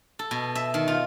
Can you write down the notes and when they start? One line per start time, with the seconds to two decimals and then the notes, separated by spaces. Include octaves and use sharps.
0.19 A4
0.31 B2
0.55 E5
0.74 D#3
0.88 F4